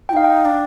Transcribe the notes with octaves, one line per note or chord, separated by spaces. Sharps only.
F4 G5
D#4 F5
G5
D4